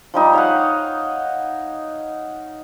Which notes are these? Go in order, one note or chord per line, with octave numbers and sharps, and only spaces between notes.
F3 G3 D#4
C#5 F5 F#5